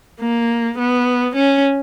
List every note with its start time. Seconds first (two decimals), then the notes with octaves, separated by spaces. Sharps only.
0.21 A#3
0.78 B3
1.36 C#4